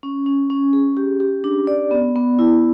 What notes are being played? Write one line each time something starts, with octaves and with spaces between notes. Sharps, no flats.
C#4
C#4
C#4
G#4
G4
G4
D4
D5
B3
B3
E4